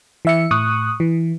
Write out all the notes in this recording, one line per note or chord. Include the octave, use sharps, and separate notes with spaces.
E3 E5 C#7
A2 C#6 D#6 F#6
E3